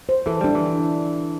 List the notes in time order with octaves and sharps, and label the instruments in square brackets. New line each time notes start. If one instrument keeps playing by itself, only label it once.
[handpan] C5
[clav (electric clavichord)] E3 [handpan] A4
[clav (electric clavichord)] G3 [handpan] D4
[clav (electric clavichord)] E3